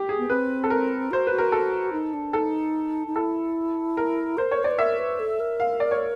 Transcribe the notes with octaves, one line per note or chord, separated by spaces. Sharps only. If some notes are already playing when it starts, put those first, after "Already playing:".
Already playing: G4
G#4
B3
C4 B4
A4
A#4
F#4 C5
F#4 B4
A#4
A4
D#4
D4
D#4 A4
D#4
E4 A4
A#4
A#4 C5
C#5
C5 D5
B4
A#4 E5
B4
A4
A#4
F5
D5
C#5